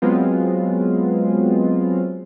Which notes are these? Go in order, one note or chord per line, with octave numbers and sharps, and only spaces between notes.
F#3 G#3 B3 C4 F4